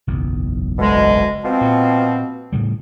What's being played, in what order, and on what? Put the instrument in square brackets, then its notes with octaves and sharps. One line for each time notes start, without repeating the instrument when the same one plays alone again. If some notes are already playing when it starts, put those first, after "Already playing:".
[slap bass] F#1 B1 E2
[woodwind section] D2 B2 G#3
B2 F3 C4
[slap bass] A#2
A2 C#3 G3